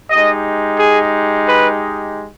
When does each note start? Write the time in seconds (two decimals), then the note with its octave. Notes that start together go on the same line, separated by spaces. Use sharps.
0.11 G#3 D#4 G4 D#5
0.79 G#4
1.46 B4